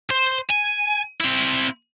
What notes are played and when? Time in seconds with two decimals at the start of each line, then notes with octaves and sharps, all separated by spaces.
0.10 C5
0.50 G#5
1.20 C4 E4